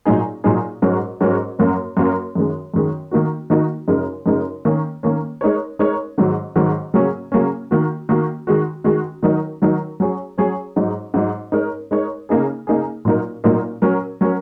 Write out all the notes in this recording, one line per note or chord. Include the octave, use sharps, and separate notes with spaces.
A#2 F#3 D#4 G#4
A#2 F#3 D#4 G#4
G#2 F#3 C#4 F#4 A#4
G#2 F#3 C#4 F#4 A#4
F#2 F#3 A#3 C#4 A#4
F#2 F#3 A#3 C#4 A#4
F#2 D#3 G#3
F#2 D#3 G#3
D#3 A#3 D#4 F#4
D#3 A#3 D#4 F#4
F#2 C#3 G#3 D#4 A#4
F#2 C#3 G#3 D#4 A#4
D#3 A#3 C#4
D#3 A#3 C#4
G#3 D#4 A#4 C#5
G#3 D#4 A#4 C#5
G#2 D#3 F#3
G#2 D#3 F#3
C#3 F#3 A#3 C#4
C#3 F#3 A#3 C#4
D#3 A#3 F#4
D#3 A#3 F#4
D#3 G#3 F#4
D#3 G#3 F#4
D#3 F#3 D#4 A#4
D#3 F#3 D#4 A#4
F#3 C#4 G#4 C#5
F#3 C#4 G#4 C#5
G#2 F#3 D#4
G#2 F#3 D#4
G#3 D#4 A#4 C#5
G#3 D#4 A#4 C#5
C#3 A#3 D#4 G#4
C#3 A#3 D#4 G#4
A#2 F#3 A#3 D#4 A#4
A#2 F#3 A#3 D#4 A#4
F#3 C#4 A#4
F#3 C#4 A#4